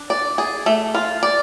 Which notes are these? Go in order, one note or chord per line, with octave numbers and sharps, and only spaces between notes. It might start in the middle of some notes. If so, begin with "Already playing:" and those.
Already playing: D4
D5
G#4
A3
F4
D5